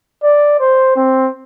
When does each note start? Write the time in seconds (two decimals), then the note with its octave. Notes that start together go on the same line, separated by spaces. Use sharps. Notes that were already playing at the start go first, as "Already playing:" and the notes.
0.24 D5
0.60 C5
0.96 C4